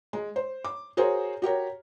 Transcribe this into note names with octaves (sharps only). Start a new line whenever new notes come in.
G#3
C5
D6
F#4 G#4 A#4 C5 C#5
F#4 G4 A#4 C#5